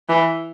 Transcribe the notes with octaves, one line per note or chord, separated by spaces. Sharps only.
E3